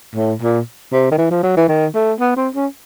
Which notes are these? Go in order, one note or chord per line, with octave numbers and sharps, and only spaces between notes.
A2
A#2
C3
D#3
E3
F3
F#3
E3
D#3
A3
B3
C4
C#4